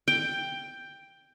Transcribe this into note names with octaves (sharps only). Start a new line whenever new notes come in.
G5